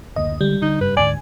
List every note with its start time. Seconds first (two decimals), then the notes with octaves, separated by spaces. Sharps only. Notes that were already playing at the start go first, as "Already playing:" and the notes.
0.16 F#1 D2 A#3 D#5
0.41 D3 G3 G#3
0.62 D3 D#4
0.81 F#1 G2 C#3 B4
0.97 D2 G#2 D3 D5 G#5